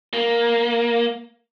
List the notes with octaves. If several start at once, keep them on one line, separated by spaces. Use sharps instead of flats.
A#3